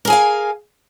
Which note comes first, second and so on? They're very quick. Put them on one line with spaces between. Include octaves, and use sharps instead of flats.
A#4 G#4 G#5 F5